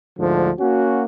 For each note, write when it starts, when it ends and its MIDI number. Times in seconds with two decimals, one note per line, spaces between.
0.19 0.50 38
0.19 0.50 44
0.19 0.50 50
0.19 0.50 53
0.59 1.03 58
0.59 1.03 61
0.59 1.03 66